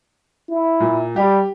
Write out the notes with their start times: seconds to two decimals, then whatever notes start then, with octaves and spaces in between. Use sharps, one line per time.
0.49 E4
0.80 A#2
1.16 G3 G4